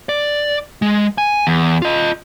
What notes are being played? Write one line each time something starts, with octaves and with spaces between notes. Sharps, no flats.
D5
G#3
G#5
E2
F4 D#5